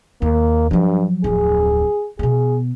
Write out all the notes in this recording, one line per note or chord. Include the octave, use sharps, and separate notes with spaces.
D#2 A#3
G2 F3 F#3
D1 F2 G#4
B2 B3 G#4